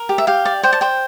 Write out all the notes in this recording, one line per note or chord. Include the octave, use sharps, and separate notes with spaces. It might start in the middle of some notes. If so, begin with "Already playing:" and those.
Already playing: A#4
G4
E5
G4 F5
D5
C5 G5
A5
C5 G5